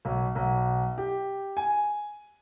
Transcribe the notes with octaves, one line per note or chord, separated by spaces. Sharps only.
B1
B1
G4
G#5